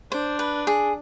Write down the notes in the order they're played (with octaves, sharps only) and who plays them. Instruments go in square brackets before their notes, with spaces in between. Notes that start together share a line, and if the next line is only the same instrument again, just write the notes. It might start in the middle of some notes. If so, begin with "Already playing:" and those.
[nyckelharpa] D4 [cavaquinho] C5
[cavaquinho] B4
G#4